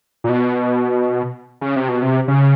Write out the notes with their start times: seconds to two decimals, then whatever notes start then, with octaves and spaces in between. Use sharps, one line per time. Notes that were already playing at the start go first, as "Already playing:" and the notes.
0.24 A#2
0.29 B2
1.61 C#3
1.76 C3
1.88 B2
2.02 C3
2.28 C#3